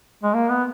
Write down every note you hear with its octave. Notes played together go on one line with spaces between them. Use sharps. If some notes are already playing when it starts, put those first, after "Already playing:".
G#3
A#3
B3